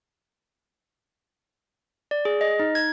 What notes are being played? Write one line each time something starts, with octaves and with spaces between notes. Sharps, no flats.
D5
G#4
D#5
D#4
G#6